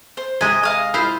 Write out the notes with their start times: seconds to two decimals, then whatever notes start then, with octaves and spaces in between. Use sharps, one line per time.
0.17 C5
0.41 C3 G#3 D#5 G#5
0.63 D#5 F5 D#6
0.94 E4 F4 C5